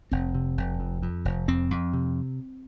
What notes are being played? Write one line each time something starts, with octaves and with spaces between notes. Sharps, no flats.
F1 C4
C3
F1
F2
F2
F1
F2 C4
F2
C3